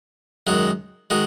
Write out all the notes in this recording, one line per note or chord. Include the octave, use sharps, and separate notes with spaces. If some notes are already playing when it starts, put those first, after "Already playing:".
F#2 D#3 G#3 F#4
D#3 G#3 F#4